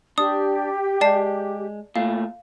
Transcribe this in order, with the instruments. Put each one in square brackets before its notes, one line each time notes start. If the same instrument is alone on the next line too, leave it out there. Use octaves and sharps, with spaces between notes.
[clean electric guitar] D4 [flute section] G4 [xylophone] D#6
[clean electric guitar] G#3 [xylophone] D5 A5 C7
[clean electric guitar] A#2 A3 [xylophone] F5